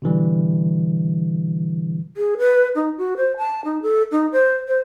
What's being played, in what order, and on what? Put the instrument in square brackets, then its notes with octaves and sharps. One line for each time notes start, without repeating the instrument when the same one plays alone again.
[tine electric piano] B2 D3 E3 G3
[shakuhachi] G#4
B4
D#4
F#4
C5
A5
D#4
A4
D#4
C5
C5